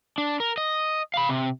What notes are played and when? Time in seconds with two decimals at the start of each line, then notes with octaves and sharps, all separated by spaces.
0.18 D4
0.40 A#4
0.58 D#5
1.14 F5 B5
1.29 C3